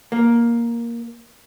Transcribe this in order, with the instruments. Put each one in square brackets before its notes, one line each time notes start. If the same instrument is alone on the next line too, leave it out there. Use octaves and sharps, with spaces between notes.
[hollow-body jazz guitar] A#3